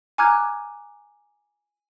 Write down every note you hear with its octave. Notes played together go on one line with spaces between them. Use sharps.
G#5 A#5 D6 F6 F#6 G#6